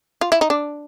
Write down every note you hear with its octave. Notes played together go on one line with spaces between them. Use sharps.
F4
E4
D#4
D4